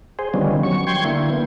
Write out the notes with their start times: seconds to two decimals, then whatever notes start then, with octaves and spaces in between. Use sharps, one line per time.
0.19 G#4 C5
0.34 D3 D#3 F3 G3 B3 C#4
0.63 F#3 C#6
0.87 G5 C6 C#6 G#6
1.05 D3 A#3 E4
1.30 B3